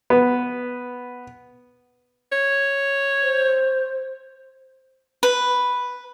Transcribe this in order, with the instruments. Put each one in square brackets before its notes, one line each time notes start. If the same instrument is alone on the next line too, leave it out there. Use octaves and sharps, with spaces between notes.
[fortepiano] B3
[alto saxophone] C#5
[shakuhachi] C5
[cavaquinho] B4